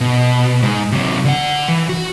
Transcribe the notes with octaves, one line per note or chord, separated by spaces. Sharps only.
B2
G#2
C3 F#3
D3 F#5
E3
F#4